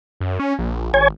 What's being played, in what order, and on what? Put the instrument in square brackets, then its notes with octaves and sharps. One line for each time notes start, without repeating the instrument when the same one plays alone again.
[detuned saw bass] F#2
C#4
A#1
[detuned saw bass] G#1 [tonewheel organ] C#5 G#5